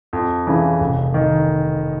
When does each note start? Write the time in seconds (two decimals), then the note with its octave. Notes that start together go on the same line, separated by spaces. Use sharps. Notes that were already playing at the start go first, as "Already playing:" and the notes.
0.13 F2
0.47 C#3 E3
0.80 F1
1.14 D#3